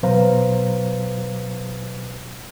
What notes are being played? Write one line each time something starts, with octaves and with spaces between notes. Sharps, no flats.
B2 F#3 B4 C5 F5 A#5